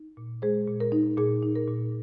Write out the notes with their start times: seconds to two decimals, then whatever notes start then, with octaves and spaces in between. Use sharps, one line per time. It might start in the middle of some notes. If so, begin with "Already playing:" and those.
Already playing: D#4
0.17 A#2
0.42 G#3 G#4 C5
0.68 A#2
0.80 A#4
0.92 D#4
1.17 A#2 G#4
1.43 D#4
1.55 A#4
1.68 A#2